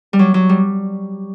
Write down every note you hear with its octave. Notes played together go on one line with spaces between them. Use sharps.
G3
F#3
F#3
G3